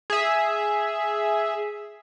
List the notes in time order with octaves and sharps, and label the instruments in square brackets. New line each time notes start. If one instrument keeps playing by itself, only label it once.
[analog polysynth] G#4 E5